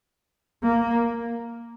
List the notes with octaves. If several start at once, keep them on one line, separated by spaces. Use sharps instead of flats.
A#3